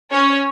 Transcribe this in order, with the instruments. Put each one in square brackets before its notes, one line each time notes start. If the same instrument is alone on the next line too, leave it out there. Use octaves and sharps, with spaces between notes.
[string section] C#4 C#5